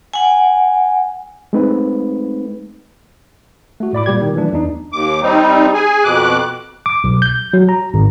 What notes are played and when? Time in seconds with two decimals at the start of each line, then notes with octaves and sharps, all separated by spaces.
0.13 F#5 G#5
1.53 G#3 A3 C4 D#4 B4
3.80 A3 F#4
3.93 A2 D5 B5 D6
4.06 A#2 G3 G4 G#6
4.22 D#3
4.35 E3 F#3 A3 D4 E4
4.53 E2 D4 D#4
4.93 D#2 D6
5.22 G3 C4 D#4
5.74 G#4 G#5
6.04 F2 B2 D6 F#6
6.86 D6
7.04 B1
7.22 G6
7.53 F#3
7.69 A#5
7.94 G#1